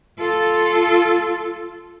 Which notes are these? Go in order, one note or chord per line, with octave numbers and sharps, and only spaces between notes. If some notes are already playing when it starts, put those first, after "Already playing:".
F4 A4